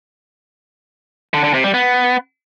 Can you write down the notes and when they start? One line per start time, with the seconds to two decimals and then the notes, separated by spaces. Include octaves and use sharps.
1.34 D3
1.44 D3
1.54 C3
1.64 G3
1.74 B3